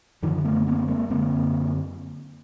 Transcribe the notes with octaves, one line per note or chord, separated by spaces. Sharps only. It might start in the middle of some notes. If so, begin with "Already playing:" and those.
F#2 D3 D#3 F3
A3 B3
B3
A#3 C4
G#3 A#3
F#2 D3 A#3 C4